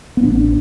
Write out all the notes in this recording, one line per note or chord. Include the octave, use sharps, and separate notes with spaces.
B3
A1 D4